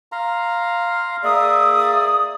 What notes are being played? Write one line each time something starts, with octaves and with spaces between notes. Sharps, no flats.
F5 A#5 C6
A#3 G#4 D5 E5 D#6